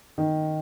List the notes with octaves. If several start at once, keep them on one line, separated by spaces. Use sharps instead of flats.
D#3